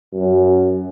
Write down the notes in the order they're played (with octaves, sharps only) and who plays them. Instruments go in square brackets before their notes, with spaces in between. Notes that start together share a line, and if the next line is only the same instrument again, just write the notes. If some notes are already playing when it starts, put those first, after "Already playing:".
[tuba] F#2